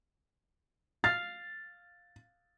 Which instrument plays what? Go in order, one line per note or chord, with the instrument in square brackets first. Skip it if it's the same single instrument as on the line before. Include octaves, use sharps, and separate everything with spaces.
[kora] F5 [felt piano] A6